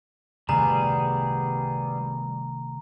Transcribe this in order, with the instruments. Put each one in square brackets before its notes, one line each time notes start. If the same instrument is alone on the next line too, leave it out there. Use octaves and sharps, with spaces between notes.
[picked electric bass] C3 D#3 A3 [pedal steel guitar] G3 B3 G#4 [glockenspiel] A#5